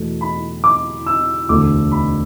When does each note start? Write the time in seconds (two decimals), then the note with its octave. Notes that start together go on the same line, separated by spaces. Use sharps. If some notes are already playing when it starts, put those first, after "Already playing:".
Already playing: E2 B2 A3
0.21 B5
0.64 D6
1.06 E6
1.49 E1 D2 D3 A3 D6
1.92 B5